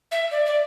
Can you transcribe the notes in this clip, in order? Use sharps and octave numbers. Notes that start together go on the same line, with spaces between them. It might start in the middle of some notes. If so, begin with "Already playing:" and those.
E5
D5
D5